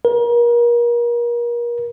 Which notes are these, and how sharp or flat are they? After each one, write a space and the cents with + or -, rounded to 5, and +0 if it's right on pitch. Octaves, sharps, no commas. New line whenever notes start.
A#4 +35